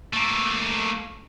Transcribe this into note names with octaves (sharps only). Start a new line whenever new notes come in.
A3 A#3